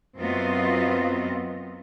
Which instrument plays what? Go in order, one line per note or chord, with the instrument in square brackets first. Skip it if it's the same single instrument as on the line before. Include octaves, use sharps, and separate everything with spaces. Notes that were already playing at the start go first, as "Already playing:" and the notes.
[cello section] F#2 B3 C4 F4 D#5